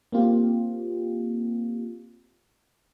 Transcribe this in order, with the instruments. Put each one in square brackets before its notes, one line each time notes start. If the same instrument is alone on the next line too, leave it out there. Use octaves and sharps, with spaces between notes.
[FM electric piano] A#3 C4 F4 G4